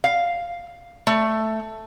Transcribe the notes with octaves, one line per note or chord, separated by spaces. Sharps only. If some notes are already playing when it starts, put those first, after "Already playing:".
F5
A3